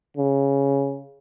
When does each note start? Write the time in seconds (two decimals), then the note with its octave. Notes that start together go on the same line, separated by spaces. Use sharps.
0.17 C#3